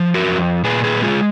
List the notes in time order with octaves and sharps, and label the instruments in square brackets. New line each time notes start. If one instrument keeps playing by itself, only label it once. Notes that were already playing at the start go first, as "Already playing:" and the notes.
Already playing: [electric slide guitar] F3
F#4 A#4
F2
A#2 G#4 B4
G#4 B4
G#3 F4 G#4